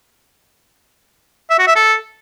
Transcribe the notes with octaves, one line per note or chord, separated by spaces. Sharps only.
E5
F#4
E5
A4